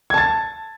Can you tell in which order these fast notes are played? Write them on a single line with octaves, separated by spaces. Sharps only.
G#6 A5 A6